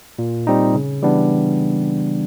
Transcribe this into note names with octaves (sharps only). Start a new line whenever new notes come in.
A#2
G3 C4 D#4
C#3
E3 G3 B3 D4